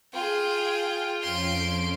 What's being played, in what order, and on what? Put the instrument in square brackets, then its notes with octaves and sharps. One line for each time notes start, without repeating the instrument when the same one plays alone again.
[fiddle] F4 [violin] G#4 G5
[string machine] F2 F3 C#4 [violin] C6 D7